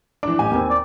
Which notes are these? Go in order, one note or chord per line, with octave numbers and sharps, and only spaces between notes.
E3 D4 D6
A1 G4 G#5
D#2 C4
D5